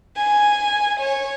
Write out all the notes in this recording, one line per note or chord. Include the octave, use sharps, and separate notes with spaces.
G#5
C#5